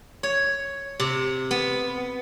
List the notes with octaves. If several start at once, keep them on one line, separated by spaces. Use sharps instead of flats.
C#5
C3
B3